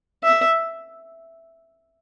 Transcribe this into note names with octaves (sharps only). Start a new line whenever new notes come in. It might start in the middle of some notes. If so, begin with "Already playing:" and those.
E5